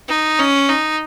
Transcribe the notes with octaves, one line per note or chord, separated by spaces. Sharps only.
D#4
C#4
D#4